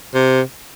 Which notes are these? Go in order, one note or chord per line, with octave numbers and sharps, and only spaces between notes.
C3